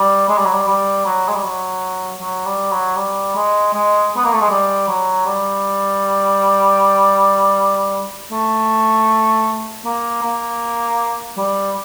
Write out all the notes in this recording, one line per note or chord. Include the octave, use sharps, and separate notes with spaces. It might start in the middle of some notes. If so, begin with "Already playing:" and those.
Already playing: G3
G#3
G3
F#3
G3
G3
F#3
G#3
G3
F#3
F#3
G3
F#3
G3
G#3
G#3
B3
A#3
A3
G#3
G3
F#3
G3
A3
A#3
A#3
G3